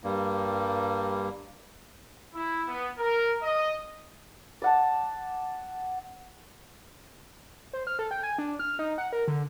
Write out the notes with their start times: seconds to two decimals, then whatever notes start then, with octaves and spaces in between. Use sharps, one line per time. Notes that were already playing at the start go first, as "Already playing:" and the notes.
0.04 G2 G3 A#3
2.34 E4
2.68 B3
2.99 A#4
3.42 D#5
4.62 D5 F#5 A5
7.73 C5
7.87 F6
7.99 A4
8.11 G5
8.23 G#5
8.38 D4
8.59 F6
8.79 D#4
8.98 F#5
9.13 A#4
9.28 D3